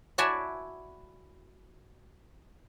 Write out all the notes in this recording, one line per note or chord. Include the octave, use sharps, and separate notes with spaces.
E4 F#4 D5 E5 G#5 A5